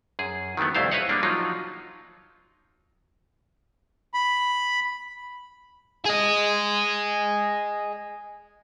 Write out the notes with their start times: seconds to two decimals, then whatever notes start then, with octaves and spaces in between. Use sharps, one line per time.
0.19 F#2 G#4
0.57 D#3 E3 F#3 A3 B3
0.75 C2 F2 A3 E4 C5 F5
0.91 B4 C#5 D#5 F5 F#5
1.09 G3 G#3 A#3 D4
1.23 F3 F#3 D#4 F4
4.14 B5
6.06 G#4 D#5